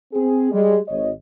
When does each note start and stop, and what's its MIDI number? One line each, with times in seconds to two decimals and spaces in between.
0.13 0.48 60
0.13 0.48 68
0.52 0.78 55
0.52 0.78 56
0.88 1.09 32
0.88 1.09 73
0.88 1.09 75